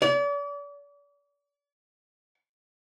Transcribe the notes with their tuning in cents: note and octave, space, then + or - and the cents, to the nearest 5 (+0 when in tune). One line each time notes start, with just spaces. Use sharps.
D5 -40